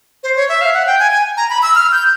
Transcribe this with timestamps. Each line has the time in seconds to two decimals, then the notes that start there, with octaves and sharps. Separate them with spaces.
0.23 C5
0.36 C#5
0.49 E5
0.61 F5
0.74 F#5
0.87 G5
0.99 G#5
1.11 G#5
1.37 A#5
1.50 B5
1.63 E6
1.75 F6
1.92 G6